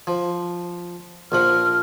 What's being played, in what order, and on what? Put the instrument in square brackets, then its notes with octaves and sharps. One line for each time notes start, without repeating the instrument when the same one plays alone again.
[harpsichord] F3
[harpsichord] A#1 F3 F#5 [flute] F6